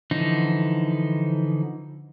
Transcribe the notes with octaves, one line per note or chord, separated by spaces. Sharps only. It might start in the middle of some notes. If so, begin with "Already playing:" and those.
D3 E3 F3 D#4